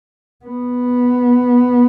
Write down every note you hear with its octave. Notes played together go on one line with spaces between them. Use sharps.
B3